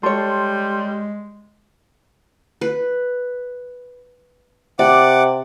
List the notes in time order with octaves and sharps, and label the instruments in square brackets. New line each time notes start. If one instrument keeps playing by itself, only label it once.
[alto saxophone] G3 [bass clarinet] G#3 [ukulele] A4 C#5 [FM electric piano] C6
[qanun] B4
[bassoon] C3 [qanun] D5 [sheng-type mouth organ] F#5 D6